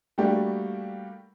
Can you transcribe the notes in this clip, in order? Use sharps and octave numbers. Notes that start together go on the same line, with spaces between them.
G3 A3 A#3 D4 F#4 G4